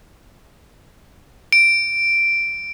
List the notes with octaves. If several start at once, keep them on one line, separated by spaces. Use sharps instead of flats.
D7